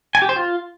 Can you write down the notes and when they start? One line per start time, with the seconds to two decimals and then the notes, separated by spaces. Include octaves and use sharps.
0.15 G#5
0.22 G4
0.29 C5
0.36 F4